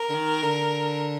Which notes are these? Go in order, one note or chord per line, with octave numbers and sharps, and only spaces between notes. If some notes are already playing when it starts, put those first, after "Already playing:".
Already playing: A#4
D3
D#3
D3